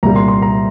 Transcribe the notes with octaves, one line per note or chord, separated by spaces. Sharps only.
C2 A#2 G3 A#5
C6
C6
A#5